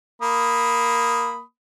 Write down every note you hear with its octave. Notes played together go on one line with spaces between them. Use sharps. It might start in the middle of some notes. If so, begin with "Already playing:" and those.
A#3 B5 D#6